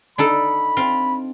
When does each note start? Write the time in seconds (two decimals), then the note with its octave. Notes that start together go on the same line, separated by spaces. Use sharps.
0.18 D4 D#4 A4 B5
0.77 C4 F4